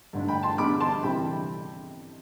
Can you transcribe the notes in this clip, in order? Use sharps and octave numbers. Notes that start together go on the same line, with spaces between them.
G2 D3 A3 D4
G5 B5
A5 C6
D3 G3 B3 D4 B5 D6
A5 C6
C3 E3 G3 G5 B5